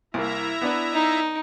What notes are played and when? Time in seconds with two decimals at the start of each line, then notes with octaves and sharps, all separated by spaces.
0.14 C2 A#3 E4 E5 A#5
0.61 B3 D4 B4
0.93 D#4